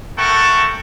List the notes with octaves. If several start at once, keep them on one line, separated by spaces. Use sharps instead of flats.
A3 A4 A#4 F#5 G5 C#6